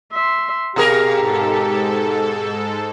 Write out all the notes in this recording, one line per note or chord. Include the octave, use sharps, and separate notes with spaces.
E5 C6
B2 G4 G#4 A#4 F5
G#2 A4